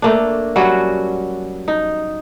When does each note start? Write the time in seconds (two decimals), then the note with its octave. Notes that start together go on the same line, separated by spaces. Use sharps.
0.02 A3 A#3 D4
0.56 F#3 G3 C#4 F#4
1.68 D#4